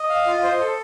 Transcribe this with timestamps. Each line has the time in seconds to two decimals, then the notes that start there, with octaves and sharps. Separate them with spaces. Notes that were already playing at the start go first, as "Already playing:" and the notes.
Already playing: D#5
0.09 F5
0.27 F4
0.43 C5
0.61 A4